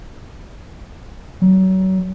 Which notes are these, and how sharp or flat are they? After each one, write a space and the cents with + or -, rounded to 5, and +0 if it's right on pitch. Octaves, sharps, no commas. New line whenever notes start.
F#3 +30